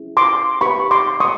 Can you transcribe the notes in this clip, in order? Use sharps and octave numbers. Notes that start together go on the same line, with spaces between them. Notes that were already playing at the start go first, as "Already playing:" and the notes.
Already playing: C#4 E4 G#4
C6 D6
D#4 G4 B4 B5 C#6
C6 D6
C#6 D#6